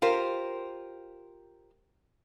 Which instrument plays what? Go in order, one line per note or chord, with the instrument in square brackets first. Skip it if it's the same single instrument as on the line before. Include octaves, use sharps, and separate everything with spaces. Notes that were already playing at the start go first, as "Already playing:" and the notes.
[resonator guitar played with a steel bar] F4 G4 A#4 C5